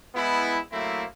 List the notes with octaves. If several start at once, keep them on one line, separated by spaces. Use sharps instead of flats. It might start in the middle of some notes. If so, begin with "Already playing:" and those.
G#3 B3 E4
F#3 A3 A#3 C4 E4